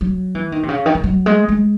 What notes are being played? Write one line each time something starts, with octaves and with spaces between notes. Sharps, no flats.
F#3
E3
D#3
C3
C#3
D#3
E3
F#3
G#3
G#3